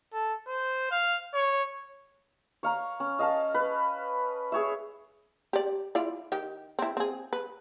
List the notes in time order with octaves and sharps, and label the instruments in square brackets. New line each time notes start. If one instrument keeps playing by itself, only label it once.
[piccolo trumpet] A4
C5
F5
C#5
[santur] C#5 F5 A#5
C#4
D#5 F5 A5
B4
G#4 C#5 E5
[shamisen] G4 D5
E4 F4 D5
D#3 G4
C4 E4
C4 G#4
B4